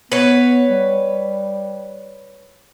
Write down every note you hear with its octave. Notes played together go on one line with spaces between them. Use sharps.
B3 B4 C#5
G3